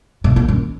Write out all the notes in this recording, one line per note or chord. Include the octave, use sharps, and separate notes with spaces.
B2
A#2
F#2